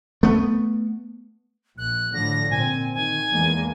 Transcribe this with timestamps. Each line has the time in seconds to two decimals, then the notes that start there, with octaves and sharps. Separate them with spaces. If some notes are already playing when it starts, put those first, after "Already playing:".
0.23 A3 B3
1.78 A#1 F#6
2.14 A2 D3 F3 A#6
2.50 A#2 C4 G#5
2.93 D#3 G#5
3.33 E2 G#3 A#3